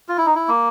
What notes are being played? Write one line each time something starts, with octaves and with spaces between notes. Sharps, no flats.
F4
E4
D#4
E4
A#3